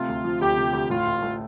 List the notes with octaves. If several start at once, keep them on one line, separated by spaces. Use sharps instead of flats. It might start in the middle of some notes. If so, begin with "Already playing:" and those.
Already playing: C3 A3 F4
D2
F3
D2 G4
C3
D2
A2 F4
A1
A3